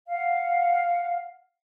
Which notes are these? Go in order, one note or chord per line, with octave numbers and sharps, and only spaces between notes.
F5 F#5